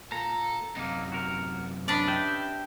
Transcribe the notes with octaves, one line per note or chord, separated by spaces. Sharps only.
A#2 A4 A#5
F#2 C3 A#3 D#4
F#4 A#4
C#4 D4 B4 D5 D#5
G4 E5 G5